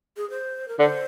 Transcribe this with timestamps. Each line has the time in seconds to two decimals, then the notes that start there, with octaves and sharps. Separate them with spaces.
0.17 G#4
0.30 C5
0.68 A#4
0.79 D3 C5